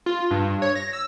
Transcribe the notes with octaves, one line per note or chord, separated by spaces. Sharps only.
F4
G2
C#5
A#6
E6